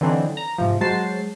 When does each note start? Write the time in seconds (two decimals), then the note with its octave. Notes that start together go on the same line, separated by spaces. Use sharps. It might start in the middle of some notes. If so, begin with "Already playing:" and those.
0.01 D3 E3 F#3 C4 D4 D#4
0.37 A#5
0.58 G#2 C3 F3
0.81 F#3 G#3 C5 A5 C7